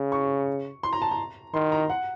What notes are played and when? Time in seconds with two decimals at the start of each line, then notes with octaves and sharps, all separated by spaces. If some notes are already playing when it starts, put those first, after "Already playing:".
Already playing: C#3
0.12 C#6
0.83 C6
0.93 A#5
1.02 A5
1.12 A#5
1.54 D#3 C6
1.72 A#5
1.90 F#5